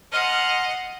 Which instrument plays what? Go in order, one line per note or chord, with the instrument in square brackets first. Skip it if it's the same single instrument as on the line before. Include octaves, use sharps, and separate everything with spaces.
[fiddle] D#5 F#5 [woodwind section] A5 C6 F6